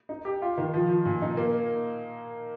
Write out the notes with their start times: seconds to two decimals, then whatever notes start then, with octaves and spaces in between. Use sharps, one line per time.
0.09 D#4
0.25 G4
0.42 F4
0.58 D#3
0.74 F3
0.89 F3
1.05 A#2
1.22 D#4
1.37 A#3